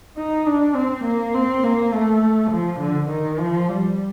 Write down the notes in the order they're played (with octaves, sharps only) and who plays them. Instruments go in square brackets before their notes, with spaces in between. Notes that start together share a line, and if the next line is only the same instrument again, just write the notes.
[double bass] D#4
D4
C4
A#3
C4
A#3
A3
F3
D3
D#3
F3
G3